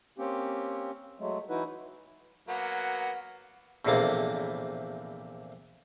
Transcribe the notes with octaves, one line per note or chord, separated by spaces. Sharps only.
A#3 C4 C#4 G4
F#3 G#3 A3
E3 D#4 E4 F#4 B4
F#3 A#3 B3 F#5
A#1 E2 A2 C3 A#3 A5